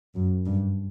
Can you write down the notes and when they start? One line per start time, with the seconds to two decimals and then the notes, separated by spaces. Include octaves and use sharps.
0.15 F#2
0.46 G2